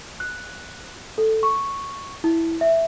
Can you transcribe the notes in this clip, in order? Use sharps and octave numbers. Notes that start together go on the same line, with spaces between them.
F#6
A4
C#6
E4
E5